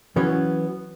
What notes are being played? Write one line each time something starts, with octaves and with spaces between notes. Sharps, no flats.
E3 F#3 B3 C#4